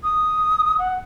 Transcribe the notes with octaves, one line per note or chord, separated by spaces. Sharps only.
D#6
F#5